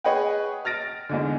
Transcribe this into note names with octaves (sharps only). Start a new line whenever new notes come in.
G#4 B4 C#5 D#5 F#5 G5
F6 A6 A#6 D7
E2 G#2 D3